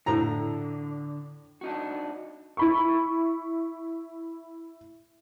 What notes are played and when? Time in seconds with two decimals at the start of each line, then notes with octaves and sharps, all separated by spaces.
0.06 A2 D3 D4 A#5
1.61 D4 D#4 F#4
2.57 E4 B5 C#6